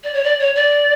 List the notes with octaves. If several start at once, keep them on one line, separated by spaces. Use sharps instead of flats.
D5
C#5
D5
C#5
D5